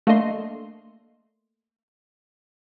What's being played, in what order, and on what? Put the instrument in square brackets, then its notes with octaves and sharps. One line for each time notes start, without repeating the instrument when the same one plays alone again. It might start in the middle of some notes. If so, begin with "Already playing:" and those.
[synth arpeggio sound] A3 A#3 D4 D#5 C6